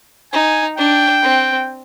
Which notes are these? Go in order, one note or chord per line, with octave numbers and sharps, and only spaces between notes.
D#4 G#5
D4 G5
C4